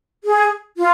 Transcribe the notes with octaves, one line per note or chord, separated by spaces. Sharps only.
G#4
F4